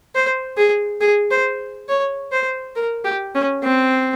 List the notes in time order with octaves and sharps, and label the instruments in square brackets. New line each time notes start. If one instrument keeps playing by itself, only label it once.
[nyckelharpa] C5
G#4
G#4
C5
C#5
C5
A#4
G4
C#4
C4